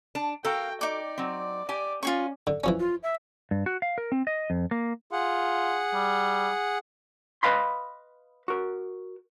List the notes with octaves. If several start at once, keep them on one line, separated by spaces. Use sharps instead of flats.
D4 A5
F#4 A4 A#4 F5 G5
D#4 D5 D6
F#3 C4
G4 D5 G#5
C#4 F4 G#4 C#6
D3
E3 F3 C#4
F4
E5
G2
F#4
F5
A#4
C4
D#5
F2
A#3
F4 G#4 F#5
G3
B4 D#5 F5 B5 C6
F#4 A#4